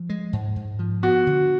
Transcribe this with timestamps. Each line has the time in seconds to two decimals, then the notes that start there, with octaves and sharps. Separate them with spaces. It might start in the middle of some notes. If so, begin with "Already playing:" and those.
Already playing: F3
0.10 G#3
0.33 G#2
0.56 G#2
0.79 F3
1.03 B3 F#4
1.27 D3